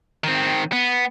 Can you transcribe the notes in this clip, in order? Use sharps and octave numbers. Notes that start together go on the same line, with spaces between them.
D#3 C4
B3